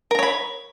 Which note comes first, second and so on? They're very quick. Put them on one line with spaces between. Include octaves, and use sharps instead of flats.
A#4 A#5 C#5 B5